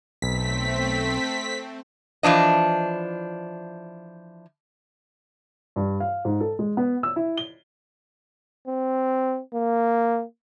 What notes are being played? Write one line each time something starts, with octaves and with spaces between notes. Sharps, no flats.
B1 A3 C4 B6
E3 F3 D4 D#5
G2
F5
G#2
A4
G#3
B3
E6
E4
G7
C4
A#3